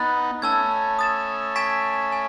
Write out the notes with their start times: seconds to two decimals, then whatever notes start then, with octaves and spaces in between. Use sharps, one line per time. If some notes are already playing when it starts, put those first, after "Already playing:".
Already playing: B3 D#4 B5 F#6 A6
0.42 A3 C#4 A5 E6 G#6
0.99 D#6 A6 E7
1.56 G#5 C#6 G#6 B6 E7
2.12 G#5